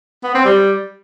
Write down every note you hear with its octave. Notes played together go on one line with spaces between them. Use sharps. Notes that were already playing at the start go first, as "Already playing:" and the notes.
B3
C4
G3